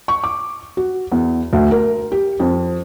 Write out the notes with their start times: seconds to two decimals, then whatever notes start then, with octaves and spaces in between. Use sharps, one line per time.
0.08 C#6
0.24 D6
0.77 F#4
1.12 E2
1.53 D2
1.71 A#4
2.12 G4
2.40 F2